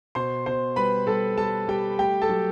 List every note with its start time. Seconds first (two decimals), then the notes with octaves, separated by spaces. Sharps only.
0.15 B2 C5 C6
0.46 B2 C5 C6
0.76 G3 B4 B5
1.07 G3 A4 A5
1.37 G3 A4 A5
1.68 G3 G4 G5
1.99 A3 G4 G5
2.22 A4 A5
2.29 F#3